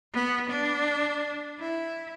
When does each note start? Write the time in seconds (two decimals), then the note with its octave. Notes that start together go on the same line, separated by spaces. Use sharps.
0.13 B3
0.50 D4
1.59 E4